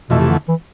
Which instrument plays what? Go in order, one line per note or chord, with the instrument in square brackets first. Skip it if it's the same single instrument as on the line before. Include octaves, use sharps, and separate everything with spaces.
[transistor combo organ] F2 E3 A3 [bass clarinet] B2
[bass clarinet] C3
D3
E3